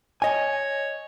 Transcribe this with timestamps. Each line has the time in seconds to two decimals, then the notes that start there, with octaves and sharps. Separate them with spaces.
0.22 C#5 D#5 G#5